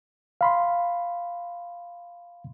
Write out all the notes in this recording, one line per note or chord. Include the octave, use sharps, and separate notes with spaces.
F5 B5 C6